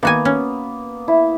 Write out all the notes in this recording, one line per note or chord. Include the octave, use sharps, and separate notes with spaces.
D#3 A#3 B3 F#4 G#5
C#4
E4